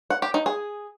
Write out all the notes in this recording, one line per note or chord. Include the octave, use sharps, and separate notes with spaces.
F#5
G4
D#4
G#4